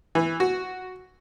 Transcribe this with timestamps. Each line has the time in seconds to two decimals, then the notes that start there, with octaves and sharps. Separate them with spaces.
0.15 E3
0.40 F#4